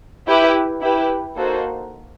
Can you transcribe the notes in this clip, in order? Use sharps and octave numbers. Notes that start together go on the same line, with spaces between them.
E4 G4 B4
E4 G4 B4
A#3 D#4 F#4 A4 C5